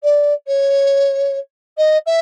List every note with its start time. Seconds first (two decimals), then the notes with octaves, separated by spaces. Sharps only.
0.03 D5
0.47 C#5
1.77 D#5
2.06 E5